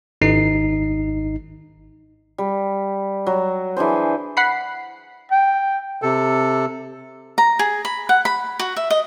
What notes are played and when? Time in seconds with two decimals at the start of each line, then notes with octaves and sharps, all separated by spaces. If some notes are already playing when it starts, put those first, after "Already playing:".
0.21 G#1 D#4 C7
2.38 G3
3.27 F#3
3.77 E3 D4 G#4 C5
4.37 F#5 B5 C7
5.31 G5
6.02 C3 A4
7.38 A#5
7.59 G#4
7.85 B5
8.09 F#5
8.25 B5
8.59 F#4
8.76 E5
8.90 D#5